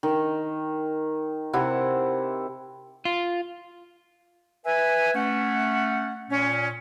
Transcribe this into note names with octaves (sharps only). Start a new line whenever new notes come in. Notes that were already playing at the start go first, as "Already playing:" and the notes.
D#3
C3 E4 F#5
F4
B4 E5 G#5
A3 C#4 F#5
A#2 C#4